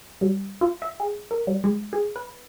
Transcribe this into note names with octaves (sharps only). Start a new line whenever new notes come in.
G3
F4
E5
G#4
A#4
G3
G#3
G#4
B4